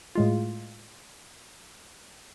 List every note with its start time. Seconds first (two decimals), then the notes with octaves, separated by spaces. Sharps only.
0.15 A2 G#3 F4